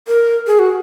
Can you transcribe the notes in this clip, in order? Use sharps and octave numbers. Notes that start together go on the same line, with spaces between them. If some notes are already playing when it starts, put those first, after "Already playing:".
A#4
G#4
F#4